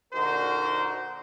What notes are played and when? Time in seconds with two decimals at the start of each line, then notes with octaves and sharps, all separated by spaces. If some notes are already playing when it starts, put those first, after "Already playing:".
0.13 A#2 D3 D#4 F#4 A#4 C5